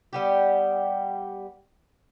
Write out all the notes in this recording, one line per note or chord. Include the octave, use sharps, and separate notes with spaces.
G3 B3 G4